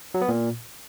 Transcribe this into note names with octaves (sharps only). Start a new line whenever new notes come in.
F#3
B3
A#2